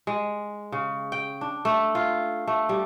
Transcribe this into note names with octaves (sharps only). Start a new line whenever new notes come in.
G#3
C#3
G5
D4
A3
F4
A3
G3